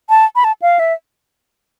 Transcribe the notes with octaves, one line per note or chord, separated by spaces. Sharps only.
A5
B5
A5
F5
E5